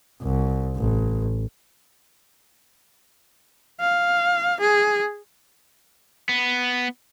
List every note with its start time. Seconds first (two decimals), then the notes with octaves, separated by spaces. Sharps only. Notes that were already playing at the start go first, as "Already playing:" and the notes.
0.22 C2
0.77 A1
3.80 F5
4.60 G#4
6.29 B3